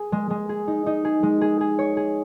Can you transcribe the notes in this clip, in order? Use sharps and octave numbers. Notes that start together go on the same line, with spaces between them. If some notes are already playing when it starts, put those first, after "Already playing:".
Already playing: G#4
G#3
G#3
G#4
D#4
D#4
G#4
G#3
G#4
G#4
C#5
G#4